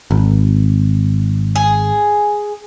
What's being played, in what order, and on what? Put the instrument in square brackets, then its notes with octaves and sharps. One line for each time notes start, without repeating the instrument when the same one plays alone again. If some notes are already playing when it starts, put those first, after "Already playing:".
[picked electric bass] G#1
[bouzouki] G#4